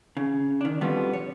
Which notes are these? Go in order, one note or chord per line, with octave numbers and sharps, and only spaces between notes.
C#3
D#3 D4
F2 B2 D3 F3 G3 B3
C#5